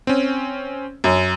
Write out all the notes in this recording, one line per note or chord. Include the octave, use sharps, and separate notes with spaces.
C4 C#4
F#2